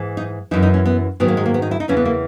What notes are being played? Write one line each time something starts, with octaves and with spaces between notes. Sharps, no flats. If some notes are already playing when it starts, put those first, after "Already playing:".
Already playing: G#2 E3
D#4
F#2 E3 D#4
D#4
C#4
B3
G#2 D#3 F#3 B3
A#3
G#3
A#3
B3
D#4
E4
D#4
E2 C#3 E3 C#4
B3
A#3